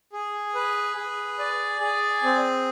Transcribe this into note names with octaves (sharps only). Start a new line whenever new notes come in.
G#4
B4
G#4
D5
G#4
C4